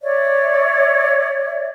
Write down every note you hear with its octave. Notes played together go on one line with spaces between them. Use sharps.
C#5 D5 E5